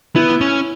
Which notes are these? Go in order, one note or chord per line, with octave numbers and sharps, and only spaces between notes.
B3 E4
C#4